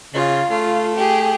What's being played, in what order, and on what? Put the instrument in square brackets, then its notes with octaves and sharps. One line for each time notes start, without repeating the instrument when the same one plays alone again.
[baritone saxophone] C#3 [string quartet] F4
[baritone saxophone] A3 [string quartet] F4
[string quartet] G4 G#4